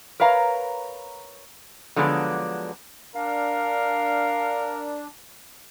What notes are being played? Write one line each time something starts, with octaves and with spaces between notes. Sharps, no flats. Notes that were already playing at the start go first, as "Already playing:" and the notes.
A#4 B4 C#5 F5 A#5
D3 F3 F#3 G#3 B3 D4
D4 A#4 F5